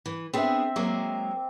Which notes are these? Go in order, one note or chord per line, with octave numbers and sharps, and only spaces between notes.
E3
B3 C4 D4 G#4 E5
F#3 G#3 A#3 D6